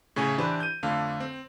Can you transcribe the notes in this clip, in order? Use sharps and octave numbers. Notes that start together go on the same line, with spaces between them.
A2 C#3 C#5 G#5
E3 D4 G4 B4 C5
G6 D#7
F2 D3 A3 F5
C4